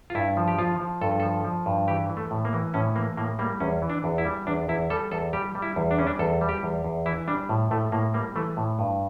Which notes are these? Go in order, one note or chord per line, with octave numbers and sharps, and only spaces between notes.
F4
G2 E4
F3
G4
F3 F4
F3
G2 A4
F3 A4
F3
G2
E3 G4
E3
A3
A2
A#3
E3
A2 C#4
E3 A#3
A2 A#3
G3 A#3
E2 C#4
E3
D4
E2
E4
G3
E2 D4
E2 E4
G3 A4
E2 A4
G3 G4
G3
E4
E2
D4
G3 C#4
D4
E2 A4
G3
G4
E2
E2
E3 E4
G3 D4
A2
A2 A3
A2 A#3
G3 A#3
E3 A3
A2
G2